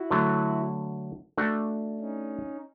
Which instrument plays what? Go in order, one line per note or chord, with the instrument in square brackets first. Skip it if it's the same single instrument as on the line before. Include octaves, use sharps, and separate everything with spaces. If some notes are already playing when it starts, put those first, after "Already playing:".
Already playing: [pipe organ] E4 F#4
[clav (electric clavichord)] D3 F#3 A3
A3 D4 F#4
[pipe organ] C#4 D#4